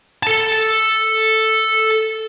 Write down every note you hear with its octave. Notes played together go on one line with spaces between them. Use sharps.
A4 A5